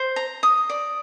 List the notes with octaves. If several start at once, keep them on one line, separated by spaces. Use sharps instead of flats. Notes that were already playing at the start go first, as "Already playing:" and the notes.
Already playing: C5
A#5
D#6
D5